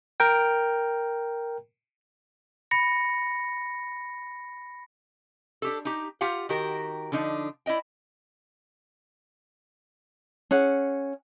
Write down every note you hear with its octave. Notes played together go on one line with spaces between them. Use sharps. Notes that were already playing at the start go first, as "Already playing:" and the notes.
A#4 G5
B5 A#6 C#7
D4 G4 A4
D#4 G4
F4 G4 F5 F#5
D#3 F#4 G4 A#4
D3 F3 D4 D#4
E4 D5 D#5 G5
C#4 G#4 F#5